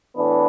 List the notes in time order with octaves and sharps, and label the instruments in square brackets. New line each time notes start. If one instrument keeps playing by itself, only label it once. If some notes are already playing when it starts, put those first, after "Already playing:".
[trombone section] A2 E3 B3 D4